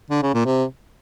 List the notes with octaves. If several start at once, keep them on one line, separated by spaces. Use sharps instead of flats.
D3
C#3
A#2
C3